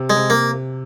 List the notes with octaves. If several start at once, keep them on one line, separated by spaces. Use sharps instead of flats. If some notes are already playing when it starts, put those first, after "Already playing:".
Already playing: C3
G#3
C3
A#3